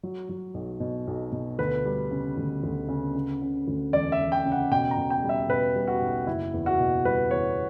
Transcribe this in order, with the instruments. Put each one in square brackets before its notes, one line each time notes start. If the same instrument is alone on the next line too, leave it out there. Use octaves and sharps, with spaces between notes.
[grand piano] F#3
F#3
B1
B2
B1
B2
D2 B4
G3
C#3
D2
D2
C#3
C#3
C#3
D2
E1 D5
E5
E1
G5
C#3
F#5
B2 G5
A#5
B2
G5
G3
E5
B2 B4
G3
F#4
B1
F#1 E4
E2
F#4
B2
G3 B4
E2 C#5